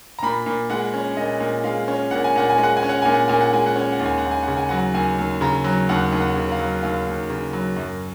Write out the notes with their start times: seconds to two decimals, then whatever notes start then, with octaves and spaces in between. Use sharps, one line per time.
0.19 A#5
0.23 A#2 B5
0.46 A#2
0.70 G#3 F#5
0.94 C#4
1.17 A#2 D#5
1.40 A#2
1.64 G#3 F5
1.88 C#4
2.11 A#2 F#5
2.24 G#5
2.36 A#2 F#5
2.50 G#5
2.58 G#3
2.64 F#5
2.77 G#5
2.83 C#4
2.89 F#5
3.02 A#2 G#5
3.14 F#5
3.28 A#2 G#5
3.41 F#5
3.53 G#3 G#5
3.66 F#5
3.76 C#4 G#5
3.92 F#5
3.99 D#2
4.05 G#5
4.18 F#5
4.24 D#2
4.31 G#5
4.43 C#3 F#5
4.57 G#5
4.69 F#3 F#5
4.94 D#2 G#5
5.18 D#2
5.41 C#3 A#5
5.64 F#3
5.89 D#2 F#5
6.12 D#2
6.20 F#5
6.36 C#3
6.52 F5
6.59 F#3
6.83 D#2 F5
7.06 D#2
7.30 C#3
7.53 F#3
7.76 F#2